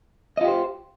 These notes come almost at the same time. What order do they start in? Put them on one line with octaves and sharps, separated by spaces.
D#5 F4 G4 C5